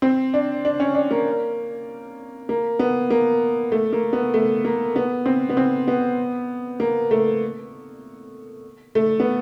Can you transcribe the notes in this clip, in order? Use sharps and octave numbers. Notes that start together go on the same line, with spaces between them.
C4
D4
D4
C#4
D4
A#3
A#3
B3
A#3
A3
A#3
B3
A3
A#3
B3
C4
B3
C4
B3
A#3
A3
A3
B3